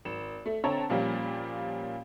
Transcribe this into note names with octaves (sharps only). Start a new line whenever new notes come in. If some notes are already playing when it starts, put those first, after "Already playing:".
G#1 E7
A3
D3 C4 C#5 A5 A#5
A#2 F3 G3 A#3 C#4